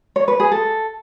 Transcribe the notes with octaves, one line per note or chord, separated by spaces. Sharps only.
C#5
B4
G#4
A4